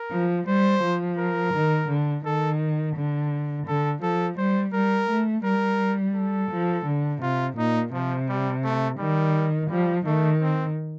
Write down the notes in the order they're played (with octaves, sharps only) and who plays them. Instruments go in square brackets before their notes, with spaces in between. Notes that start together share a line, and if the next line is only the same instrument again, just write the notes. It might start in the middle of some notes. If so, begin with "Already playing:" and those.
Already playing: [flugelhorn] A#4
[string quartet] F3
[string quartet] G3 [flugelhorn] C5
[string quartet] F3
[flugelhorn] A#4
[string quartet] D#3
D3
[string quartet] D#3 [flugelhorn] A4
[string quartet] D3
[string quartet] D3 [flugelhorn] A4
[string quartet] F3 [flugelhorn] A4
[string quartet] G3 [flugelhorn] C5
[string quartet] G3 [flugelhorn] A#4
[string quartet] A3
[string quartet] G3 [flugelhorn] A#4
[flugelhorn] A4
[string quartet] F3
D3
[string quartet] C3 [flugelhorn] F4
[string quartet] A#2 [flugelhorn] D#4
[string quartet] C3 [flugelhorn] F3
[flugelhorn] G3
A3
[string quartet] D#3 [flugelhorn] G3
[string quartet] F3 [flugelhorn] G3
[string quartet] D#3 [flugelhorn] A3
[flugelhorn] C4